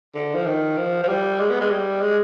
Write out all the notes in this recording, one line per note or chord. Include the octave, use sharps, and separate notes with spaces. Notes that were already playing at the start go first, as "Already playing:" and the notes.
D3
F3
D#3
F3
F3
G3
G#3
B3
G#3
G3
G#3